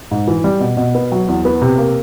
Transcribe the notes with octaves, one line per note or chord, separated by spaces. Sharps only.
G#2
E3
G3
B2
B2
B3
F#3
E2
B3
C3
A#3